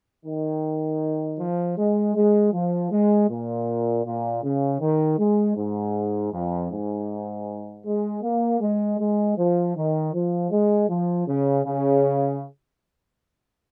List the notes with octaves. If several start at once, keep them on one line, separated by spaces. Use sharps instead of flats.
D#3
F3
G#3
G#3
F3
G#3
A#2
A#2
C#3
D#3
G#3
G#2
F2
G#2
G#3
A#3
G#3
G#3
F3
D#3
F3
G#3
F3
C#3
C#3